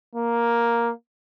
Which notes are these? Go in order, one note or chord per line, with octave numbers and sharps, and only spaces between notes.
A#3